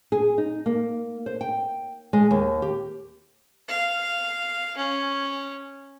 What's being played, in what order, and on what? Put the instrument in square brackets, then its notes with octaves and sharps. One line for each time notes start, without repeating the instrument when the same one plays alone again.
[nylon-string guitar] G#4
D#4
A#3
C5
G5
G#3
D#2
G4
[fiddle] F5
C#4